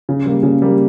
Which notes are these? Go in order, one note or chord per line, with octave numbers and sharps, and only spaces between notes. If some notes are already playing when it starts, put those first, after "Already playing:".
C#3
G3 A#3
C#3
G3 A#3